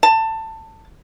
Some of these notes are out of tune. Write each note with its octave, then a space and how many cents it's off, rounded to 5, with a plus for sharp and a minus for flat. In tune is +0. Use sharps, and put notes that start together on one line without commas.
A5 +20